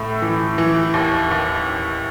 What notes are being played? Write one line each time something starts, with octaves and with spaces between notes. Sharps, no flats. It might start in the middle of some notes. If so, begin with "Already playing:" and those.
Already playing: A2 A3
E3
E3
D#2
D#2